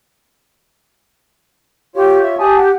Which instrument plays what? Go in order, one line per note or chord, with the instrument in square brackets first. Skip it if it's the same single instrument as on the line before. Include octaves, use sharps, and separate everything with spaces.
[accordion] F4 C#5 [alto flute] G4
[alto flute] E5
[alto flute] G4 [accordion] G#5 A5 D#6
[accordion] F#5